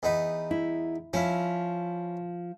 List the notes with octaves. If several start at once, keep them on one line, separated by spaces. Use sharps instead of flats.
E2 D#4 B4
E4
F3 C#4 E4